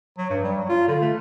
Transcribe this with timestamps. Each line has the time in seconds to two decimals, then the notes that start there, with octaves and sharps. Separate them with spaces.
0.18 F#3
0.30 G2
0.44 G3
0.57 F#3
0.69 F4
0.88 D3
1.02 A3